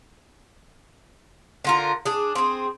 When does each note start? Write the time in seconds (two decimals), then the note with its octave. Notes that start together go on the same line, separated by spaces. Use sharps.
1.65 D3 F4 A#4
2.05 D4 G#4
2.35 C4 G#4